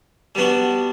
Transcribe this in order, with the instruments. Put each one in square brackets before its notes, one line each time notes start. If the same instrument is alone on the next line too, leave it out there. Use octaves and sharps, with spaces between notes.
[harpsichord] G3 B3 D4 F#4